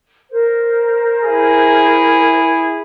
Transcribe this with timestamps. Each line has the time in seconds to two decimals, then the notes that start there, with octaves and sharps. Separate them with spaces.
0.31 A#4 C5
1.24 E4 G#4